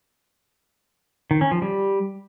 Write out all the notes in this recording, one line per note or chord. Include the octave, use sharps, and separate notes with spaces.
D#3
C#4
F3
G3